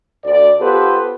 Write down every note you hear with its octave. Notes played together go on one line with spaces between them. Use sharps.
D2 D5
B3 F4 G4 A4 B4 C5